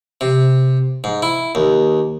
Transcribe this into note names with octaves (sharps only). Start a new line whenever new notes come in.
C3
G#2
E4
D#2